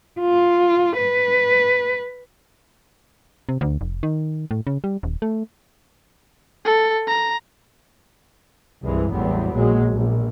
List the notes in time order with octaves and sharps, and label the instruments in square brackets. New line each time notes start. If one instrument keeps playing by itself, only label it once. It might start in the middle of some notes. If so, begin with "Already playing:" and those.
[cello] F4
B4
[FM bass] C3
D2
F1
D#3
A2
C#3
G3
D#1
A3
[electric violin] A4
A#5
[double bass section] C2 G2 C3 E3 G#3
A1 E2 F#3 G3 B3 C4
A#1 A#2 F#3 G#3
A#1 B2